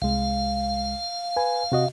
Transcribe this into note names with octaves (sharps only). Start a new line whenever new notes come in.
C2 G#3 F5
B4 G#5
C3 F#4 D#5